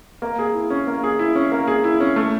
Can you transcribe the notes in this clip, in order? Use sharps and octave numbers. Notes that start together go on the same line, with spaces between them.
A#3
G#4
E4
C#4
A#3
G#4
E4
C#4
A#3
G#4
E4
C#4
A3